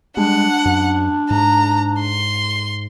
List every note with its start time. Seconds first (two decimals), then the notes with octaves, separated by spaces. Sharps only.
0.17 G3 G#3 D4 F#5
0.65 F#2
1.31 G#2 A#5
2.00 C6